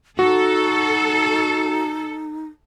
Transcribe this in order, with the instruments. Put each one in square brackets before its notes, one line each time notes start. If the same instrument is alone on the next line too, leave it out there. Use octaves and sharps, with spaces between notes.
[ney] D#4 [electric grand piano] F#4 [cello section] A4